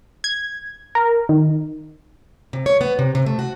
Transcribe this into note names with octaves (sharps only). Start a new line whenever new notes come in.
G#6
A#4
D#3
C3
C#5
B3
C3
C3
A3
F#4